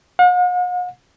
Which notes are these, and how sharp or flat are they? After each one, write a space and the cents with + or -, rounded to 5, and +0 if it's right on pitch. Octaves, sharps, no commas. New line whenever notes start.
F#5 -45